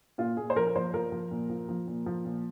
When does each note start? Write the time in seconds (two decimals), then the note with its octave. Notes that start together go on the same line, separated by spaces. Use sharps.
0.18 A#2 F4
0.37 A#2 G#4
0.50 C5
0.56 F3 A#4
0.67 A#4
0.76 F3 C5
0.94 F3 A#4
1.12 F3
1.31 A#2
1.50 F3
1.69 F3
1.88 A#2
2.06 F3
2.25 A#2